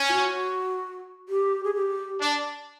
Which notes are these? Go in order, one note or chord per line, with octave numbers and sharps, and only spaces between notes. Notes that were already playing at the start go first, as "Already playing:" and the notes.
Already playing: C#4
F4
F#4
G4
G#4
G4
D4